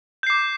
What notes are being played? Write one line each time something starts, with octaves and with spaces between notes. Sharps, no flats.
D6 G6 C7